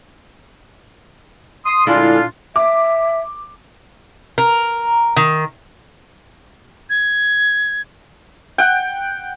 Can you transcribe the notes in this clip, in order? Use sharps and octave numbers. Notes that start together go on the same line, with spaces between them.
C6 D#6
A#2 D3 G#3 D4 E4 F4
E5 D6
A#4
D#3
G#6
F#5 G5